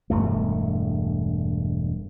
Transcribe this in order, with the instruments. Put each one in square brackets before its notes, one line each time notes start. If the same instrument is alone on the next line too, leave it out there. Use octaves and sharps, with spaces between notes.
[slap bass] E1 G2 A3